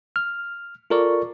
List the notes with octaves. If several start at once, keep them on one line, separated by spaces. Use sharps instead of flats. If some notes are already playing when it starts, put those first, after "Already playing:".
F6
F4 A4 A#4 D5 C#6